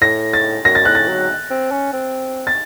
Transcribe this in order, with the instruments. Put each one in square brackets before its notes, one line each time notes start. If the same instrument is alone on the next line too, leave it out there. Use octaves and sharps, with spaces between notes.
[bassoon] A2 [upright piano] A#6
[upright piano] A6
[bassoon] F#2 [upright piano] A#6
[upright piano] A6
[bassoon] A2 [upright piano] F#6
[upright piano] A6
[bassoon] F#3
C4
C#4
C4
[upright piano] A6